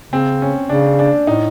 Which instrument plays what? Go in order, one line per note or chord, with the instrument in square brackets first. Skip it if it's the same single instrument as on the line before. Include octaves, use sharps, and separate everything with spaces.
[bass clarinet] C#3 [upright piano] C4
[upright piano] C#4
[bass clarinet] C#3 [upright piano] D4
[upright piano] D4
[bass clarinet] A2 [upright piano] D#4